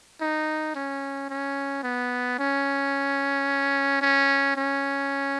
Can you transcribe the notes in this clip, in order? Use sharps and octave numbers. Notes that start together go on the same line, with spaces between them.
D#4
C#4
C#4
B3
C#4
C#4
C#4